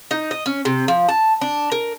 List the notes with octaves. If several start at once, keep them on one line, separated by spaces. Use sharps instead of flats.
D#4
D#5
C#4
C3
F3
A5
D4
A#4